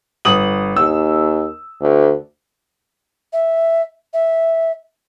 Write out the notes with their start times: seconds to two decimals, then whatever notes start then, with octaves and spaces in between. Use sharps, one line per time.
0.25 G1 D#6 F#7
0.76 D#2 E6
1.81 D2
3.33 E5
4.14 E5